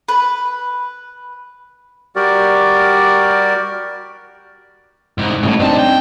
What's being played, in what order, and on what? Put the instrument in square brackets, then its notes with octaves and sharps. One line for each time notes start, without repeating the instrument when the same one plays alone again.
[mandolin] B4
[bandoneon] G3 F#4 G4 A#4 D5
[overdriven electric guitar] C2 G#2
[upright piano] A1 [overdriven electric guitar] A2 C#3
[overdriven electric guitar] G2 A5 [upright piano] C4 D4 D#4
[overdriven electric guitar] G5